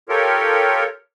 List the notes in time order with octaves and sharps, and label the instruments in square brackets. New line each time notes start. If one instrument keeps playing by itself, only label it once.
[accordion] F4 G4 A4 A#4 C#5